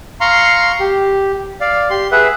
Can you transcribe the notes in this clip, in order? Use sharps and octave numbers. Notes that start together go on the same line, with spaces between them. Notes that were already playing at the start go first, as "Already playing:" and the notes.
F5 A#5 C6 C#6
G4
D5 F5
G4 C6
G#4 B4 E5 F#5